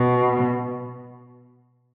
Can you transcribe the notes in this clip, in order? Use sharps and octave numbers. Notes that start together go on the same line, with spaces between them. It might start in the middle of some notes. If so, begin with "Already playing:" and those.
Already playing: B2